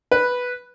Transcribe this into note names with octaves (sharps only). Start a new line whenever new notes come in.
B4